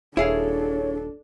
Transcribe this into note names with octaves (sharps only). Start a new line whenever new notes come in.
D#1 D4 E4 G#4 A4 C#5 F5